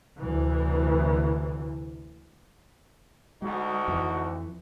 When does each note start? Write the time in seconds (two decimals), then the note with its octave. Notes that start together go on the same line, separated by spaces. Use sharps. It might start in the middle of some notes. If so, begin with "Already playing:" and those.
0.23 D2 C3 E3
3.42 D2 G#3 D#4 F#4
3.88 F2 E3